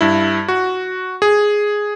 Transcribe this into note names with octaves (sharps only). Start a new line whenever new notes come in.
G2 E4
F#4
G#4